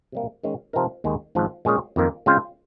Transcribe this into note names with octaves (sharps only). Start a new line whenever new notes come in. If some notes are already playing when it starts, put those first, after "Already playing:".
C3 G3 A#3
D#3 G#3 C#4
C3 F3 C4 D#4 A#4
D#2 D#3 G#3
G#1 G#2 F3
A#2 G#3 C#4 G#4 C#5
F2 D#3 A#3
C#3 G#3 C4 F4 C5